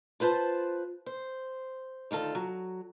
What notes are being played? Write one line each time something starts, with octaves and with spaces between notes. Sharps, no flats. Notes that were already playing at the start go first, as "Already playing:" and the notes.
F4 B4 C5 E5 A5
C5
D2 D#3 F4 A4
F#3